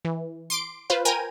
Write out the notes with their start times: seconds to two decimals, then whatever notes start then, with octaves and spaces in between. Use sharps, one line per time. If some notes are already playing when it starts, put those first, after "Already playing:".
0.05 E3
0.50 C6 D6 D7
0.90 F4 B4 C5 F5
1.05 A#4 G5 G#5 A#5 D#7